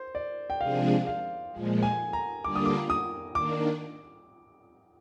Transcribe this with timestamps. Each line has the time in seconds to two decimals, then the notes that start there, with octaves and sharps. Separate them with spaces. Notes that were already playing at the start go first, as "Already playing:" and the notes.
Already playing: C5
0.15 D5
0.50 G5
0.61 C3 F3 G#3 D4 G#4 F5
1.07 F5
1.52 A#2 F3 G#3
1.83 G#5
2.13 A#5
2.44 D3 G3 A#3 D4 F4 D6
2.56 D#6
2.66 D6
2.90 D#6
3.35 D#3 A#3 D4 D6